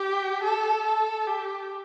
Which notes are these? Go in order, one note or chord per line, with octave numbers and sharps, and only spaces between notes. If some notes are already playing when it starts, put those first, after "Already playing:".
Already playing: G4
A4
A4
G4